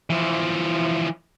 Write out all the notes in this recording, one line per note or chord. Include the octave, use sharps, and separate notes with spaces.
E3 F3